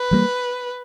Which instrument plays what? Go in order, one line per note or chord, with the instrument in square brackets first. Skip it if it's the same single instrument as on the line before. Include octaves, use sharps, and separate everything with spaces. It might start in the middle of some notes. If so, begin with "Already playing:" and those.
Already playing: [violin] B4
[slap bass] E3 G3 A#3